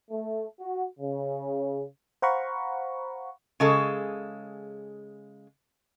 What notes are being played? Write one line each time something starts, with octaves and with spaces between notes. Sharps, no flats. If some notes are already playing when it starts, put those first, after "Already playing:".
A3
F#4
C#3
C5 F5 F#5 A#5 B5 C#6
C#3 G#3 A4